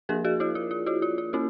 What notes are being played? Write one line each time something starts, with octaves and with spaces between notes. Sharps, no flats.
F3 A#3 D4 G#4 A#4
F#4 G#4
E4 F#4
F4
F4
E4 F#4
F4
F4
A#3 C#4 E4 F#4